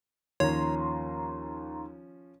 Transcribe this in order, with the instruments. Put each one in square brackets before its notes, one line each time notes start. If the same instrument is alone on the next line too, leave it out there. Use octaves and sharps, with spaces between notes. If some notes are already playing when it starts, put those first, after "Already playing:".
[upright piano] D#2 [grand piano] F3 C#4 [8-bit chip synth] C#5 [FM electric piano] A#5 C6